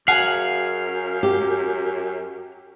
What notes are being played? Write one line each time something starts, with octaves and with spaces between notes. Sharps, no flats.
F#2 G#4 F5 F#5
G4